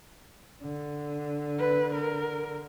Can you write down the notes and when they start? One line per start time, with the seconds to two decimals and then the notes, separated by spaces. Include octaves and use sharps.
0.63 D3
1.59 B4
1.94 A#4